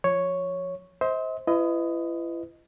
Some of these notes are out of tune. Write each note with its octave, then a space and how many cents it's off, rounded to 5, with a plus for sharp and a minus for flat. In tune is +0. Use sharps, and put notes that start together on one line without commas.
F3 +0 C#5 +0
C5 +0 D#5 +45
E4 +40 B4 +30 D#5 +0